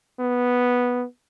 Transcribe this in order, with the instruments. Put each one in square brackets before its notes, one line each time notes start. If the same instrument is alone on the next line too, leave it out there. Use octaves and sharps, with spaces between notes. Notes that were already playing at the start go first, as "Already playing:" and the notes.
[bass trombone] B3